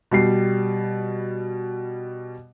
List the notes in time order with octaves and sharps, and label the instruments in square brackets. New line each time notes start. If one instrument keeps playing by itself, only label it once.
[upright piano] B2 G3 C7